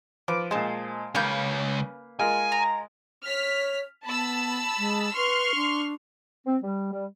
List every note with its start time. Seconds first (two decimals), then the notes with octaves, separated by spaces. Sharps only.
0.28 F3 B4 D6
0.51 A#2 G#3 C5 A5
1.15 C#2 C#3 A#3 C#4 B4 C#5 G6
2.19 G#3 F4 A#4 G#5
2.52 A#5
3.27 C#5 F6 B6
4.06 B3 A5 B5 E6
4.78 G#3
5.16 B4 C6 C#6 F6
5.55 D4
6.47 C4
6.62 G3
6.92 G3